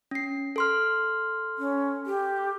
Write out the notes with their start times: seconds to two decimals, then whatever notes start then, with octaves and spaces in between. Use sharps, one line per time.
0.11 C#4 C7
0.56 A4 C6 F6
1.58 C#4
2.06 G4